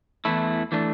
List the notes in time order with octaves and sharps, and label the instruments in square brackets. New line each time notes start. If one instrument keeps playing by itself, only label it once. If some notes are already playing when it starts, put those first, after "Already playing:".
[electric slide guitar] E2 E3 A3 E4
E3 A3 D4